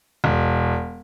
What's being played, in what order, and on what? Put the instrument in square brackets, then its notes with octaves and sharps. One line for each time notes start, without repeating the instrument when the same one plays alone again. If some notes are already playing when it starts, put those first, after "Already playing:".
[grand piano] E1